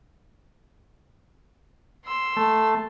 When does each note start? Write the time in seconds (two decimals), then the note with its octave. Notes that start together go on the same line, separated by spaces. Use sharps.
2.05 C6 E6
2.37 A3